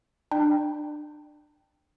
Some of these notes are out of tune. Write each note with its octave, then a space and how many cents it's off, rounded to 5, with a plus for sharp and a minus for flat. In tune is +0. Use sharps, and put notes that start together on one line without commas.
D4 +30 G5 +0 B5 -25